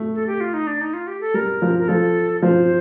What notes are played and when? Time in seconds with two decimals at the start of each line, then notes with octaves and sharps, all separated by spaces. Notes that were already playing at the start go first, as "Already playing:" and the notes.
Already playing: A3
0.14 A4
0.27 G4
0.40 F4
0.54 D#4
0.67 D4
0.81 D#4
0.94 F4
1.07 G4
1.21 A4
1.34 G3 A#4
1.62 F3
1.79 A#4
1.88 F3 A4
2.42 F3 C5